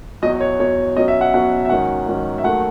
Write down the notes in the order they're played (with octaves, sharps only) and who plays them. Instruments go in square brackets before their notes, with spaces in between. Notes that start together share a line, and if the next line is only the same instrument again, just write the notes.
[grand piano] E2 B2 F#3 D#5
C#5
E2 B2 F#3 C#5
B2 F#3 C#4 D#5
E5
F#5
B2 F#3 C#4 F#5
E5
G#2 D#3 F#3 C#4 F#5
G#2 D#3 F#3 C#4
E5
D#2 D#3 F#3 A3 F#5